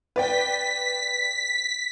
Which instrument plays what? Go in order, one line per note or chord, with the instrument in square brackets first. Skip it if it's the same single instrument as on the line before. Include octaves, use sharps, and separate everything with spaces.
[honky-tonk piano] B4 D5 G5 [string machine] B6